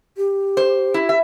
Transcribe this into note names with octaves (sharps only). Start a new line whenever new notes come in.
G4
C5
E4
E5